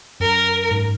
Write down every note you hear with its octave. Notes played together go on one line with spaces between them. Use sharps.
F#2 A#4
G#2